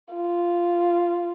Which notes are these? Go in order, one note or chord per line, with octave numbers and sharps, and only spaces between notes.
F4